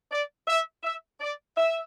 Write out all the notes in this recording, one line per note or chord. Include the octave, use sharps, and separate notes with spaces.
D5
E5
E5
D5
E5